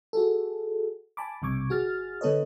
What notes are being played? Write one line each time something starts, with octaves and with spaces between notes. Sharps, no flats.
F#4 G#4 A4
G#5 A5 B5 D6
B1 G2 C3 C#6 D6 G#6
G1 F#4 G#4 F6 A6
D3 B3 A4 B4 C#5 D#5